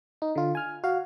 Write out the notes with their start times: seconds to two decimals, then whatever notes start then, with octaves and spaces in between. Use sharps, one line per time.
0.22 D#4
0.35 D3 F4
0.55 G#5 F6
0.84 F#4 F5